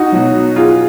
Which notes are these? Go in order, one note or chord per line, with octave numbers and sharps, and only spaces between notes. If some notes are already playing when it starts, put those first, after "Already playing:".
Already playing: D#4 F#4
B2 F#3
F4 G#4